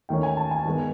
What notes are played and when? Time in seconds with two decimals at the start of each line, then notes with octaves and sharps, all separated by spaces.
0.09 D#2 D#3 F#3 A3 C#4 G5
0.23 G#5
0.37 A5
0.51 G#5
0.65 G2 D#3 G#3 B3